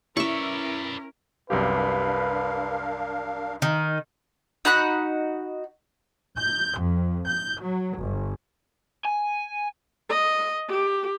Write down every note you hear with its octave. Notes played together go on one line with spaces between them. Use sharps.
C#4 E4 A#4 B4 D5 E5 C#6
C2 F#2 D4 G4 A#4 B4 F5
D#3 D#4
D#4 F#4 B5 F#6
G6
F2
G6
F#3
G1
G#5
D#5
G4